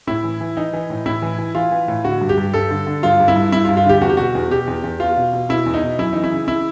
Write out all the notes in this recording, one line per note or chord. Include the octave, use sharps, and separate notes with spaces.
A2 E4
E3
E3
E3 D#4
E3
A2
A2 E4
E3
E3
E3 F4
E3
A2
D3 F#4
G2
G4
G2
G2 A4
D3
D3
G2 F4
G2
E4
G2
G2 E4
F4
G2
F4
D3 G4
E2 F#4
G4
B2 F#4
E2
B2 G4
E2
E2
E2 F4
B2
B2
B2 E4
E2
D#4
B2
F#2 E4
E3 D#4
E4
C#3
E4